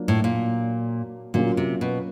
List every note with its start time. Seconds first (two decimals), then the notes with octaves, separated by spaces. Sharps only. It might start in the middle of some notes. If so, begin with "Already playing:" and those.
Already playing: F#3 A#3 D4 F4
0.08 A2
0.24 A#2
1.34 A#2 F#3 A#3 C#4 F4
1.57 C3
1.81 B2